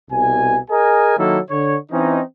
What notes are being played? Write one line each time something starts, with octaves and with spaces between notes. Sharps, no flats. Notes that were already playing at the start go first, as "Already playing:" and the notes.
C2 B2 G#5
G#4 A#4 D#5 G#5
D#3 F#3 A#3 E4 A4
D3 C#5
E3 C4 C#4 D#4